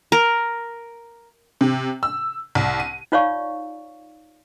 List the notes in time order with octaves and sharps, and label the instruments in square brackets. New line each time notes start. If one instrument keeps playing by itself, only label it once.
[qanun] A#4
[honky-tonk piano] C3
E6
C2
D#7
[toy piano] D#4 F4 C#5 D5 F5 C#6